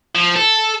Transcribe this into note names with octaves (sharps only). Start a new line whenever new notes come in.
F3
A4